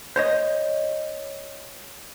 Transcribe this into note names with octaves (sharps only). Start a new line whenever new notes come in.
C5 C#5 D#5